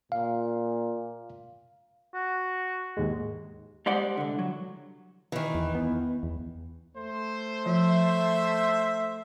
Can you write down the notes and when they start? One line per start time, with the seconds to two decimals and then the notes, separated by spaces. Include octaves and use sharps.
0.12 A#2 F5
2.14 F#4
2.97 D#2 G#2 G#3
3.86 G3 G#3 C5 D5 F#5
4.17 C2 D3
4.39 F#3
5.32 D#3 E3
5.55 E2
5.75 B3
6.23 E2
6.96 A3 C5
7.66 F3 E5